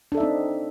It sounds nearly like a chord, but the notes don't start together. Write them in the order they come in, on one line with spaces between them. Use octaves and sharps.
D4 A4 E5 D#4 C4